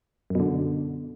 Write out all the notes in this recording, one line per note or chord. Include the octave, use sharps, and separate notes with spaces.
F#2 B2 D3